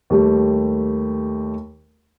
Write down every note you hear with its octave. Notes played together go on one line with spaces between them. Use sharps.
D#2 G3 A3 G4